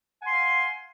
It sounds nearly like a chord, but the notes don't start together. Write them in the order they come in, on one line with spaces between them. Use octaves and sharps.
F#5 G#5 C6 F5